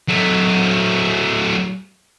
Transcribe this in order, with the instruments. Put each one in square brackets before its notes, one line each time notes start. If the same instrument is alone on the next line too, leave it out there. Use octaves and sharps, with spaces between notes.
[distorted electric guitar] F#3 A3